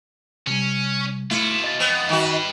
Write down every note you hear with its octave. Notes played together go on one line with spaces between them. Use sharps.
C3 G3 C#4
B2 A3 E4 F4 C#7
D#5 A6
F2 B2 B3
D#3 G3 F#4 B4